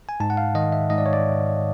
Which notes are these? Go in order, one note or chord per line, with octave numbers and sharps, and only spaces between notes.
G#5
G#2 A5
F#5
F5
D#3 D#5
E5
G#2 D#5
D5
C#5
D5